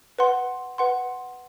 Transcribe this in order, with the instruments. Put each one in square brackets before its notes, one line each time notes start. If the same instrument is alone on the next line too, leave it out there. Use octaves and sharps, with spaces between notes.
[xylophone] B4 F#5 C6
B4 F#5 C6